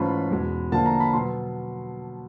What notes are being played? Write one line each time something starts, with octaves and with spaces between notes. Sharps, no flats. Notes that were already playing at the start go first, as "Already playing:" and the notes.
Already playing: G#2 E3 A3 C#4 F4 B5
E2 B2 G#3
D3 F3 A#3 A5
A#5
B5
B2 F#3 B3 C6